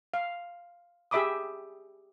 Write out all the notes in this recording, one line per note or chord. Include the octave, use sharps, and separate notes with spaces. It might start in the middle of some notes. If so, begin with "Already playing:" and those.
F5
G4 G#4 E5 B5 D6 D#6